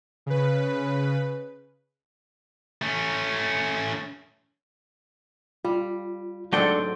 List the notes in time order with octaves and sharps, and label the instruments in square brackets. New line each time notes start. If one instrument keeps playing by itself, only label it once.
[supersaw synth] C#3 B4
[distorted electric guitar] A3 C#4
[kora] G3 [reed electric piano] F4
[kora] G#2 C4 F#5 [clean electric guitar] F#3 A3 G5 [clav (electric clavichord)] D4 A4